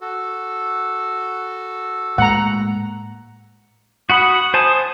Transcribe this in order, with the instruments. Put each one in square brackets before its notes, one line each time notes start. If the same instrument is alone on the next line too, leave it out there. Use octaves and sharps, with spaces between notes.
[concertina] F#4 A4
[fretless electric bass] A2 G#3 A#3 [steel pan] F#5 A#5
[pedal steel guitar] F#4 F#5 B5 [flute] D#6
[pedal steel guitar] C5 G#5 A5